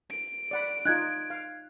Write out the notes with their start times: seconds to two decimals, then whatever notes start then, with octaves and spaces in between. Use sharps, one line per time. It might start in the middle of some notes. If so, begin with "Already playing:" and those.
0.10 D7
0.51 D5 F#5 B5
0.85 D#4 F4 F#6 G#6
1.30 F5